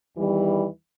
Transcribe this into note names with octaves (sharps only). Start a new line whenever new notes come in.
E2 D#3 E3 G3